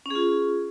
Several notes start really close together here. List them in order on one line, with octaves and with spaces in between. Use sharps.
C#4 G#4 F4